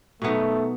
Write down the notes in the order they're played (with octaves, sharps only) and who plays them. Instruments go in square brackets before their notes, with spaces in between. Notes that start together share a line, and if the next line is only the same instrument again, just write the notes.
[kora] B2 F#3 B3 D#4 [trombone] A3